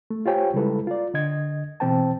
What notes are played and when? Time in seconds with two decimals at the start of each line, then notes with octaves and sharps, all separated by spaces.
0.10 A3
0.26 F4 G4 C5 C#5 G5 G#5
0.54 C#3 G3 G#3 E4 A4 B4
0.87 F4 D5
1.14 D3 D#5 G#6
1.80 B2 E3 C4 C5 G5 A5